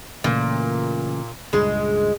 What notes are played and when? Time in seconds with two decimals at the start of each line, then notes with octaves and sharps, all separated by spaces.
0.24 A#2 C#3 E3 A3
1.53 C#2 G2 A#2 G#3